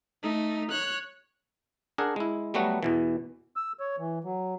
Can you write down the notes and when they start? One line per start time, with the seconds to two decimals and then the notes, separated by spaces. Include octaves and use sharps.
0.23 A3 D#4
0.71 C#5 F#6
1.98 D4 G#4 A#4 F#5
2.16 G#3 E4
2.54 F#3 G3 A3 B3 F#4
2.83 E2 B2 E3
3.56 E6
3.80 C#5
3.98 E3
4.24 F#3